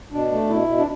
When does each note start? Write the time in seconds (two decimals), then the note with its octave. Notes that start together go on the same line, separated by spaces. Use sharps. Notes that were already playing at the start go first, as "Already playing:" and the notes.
0.12 B2 D4
0.31 A3
0.49 B2 E4
0.68 B2
0.78 D4